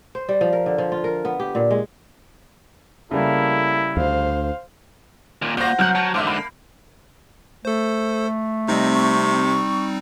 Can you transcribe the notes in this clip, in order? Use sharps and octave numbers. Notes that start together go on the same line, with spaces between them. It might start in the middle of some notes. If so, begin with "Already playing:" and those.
C5
G3
F3
A#4
D3
F3
F4
A#4
B3
G4
A#2
G#3
C#3 G3 A3 A#3 E4
D2 C5 F5
D#2 A#2
A#2 F#4 C5 G6 A#6
C2 F#3 F#5 F6 G6
F#3 A5
G#2 D3 E5 C6 D6
A#3 B5
A3 A4 C5
C3 G3 C4 D#4 D#5
C#6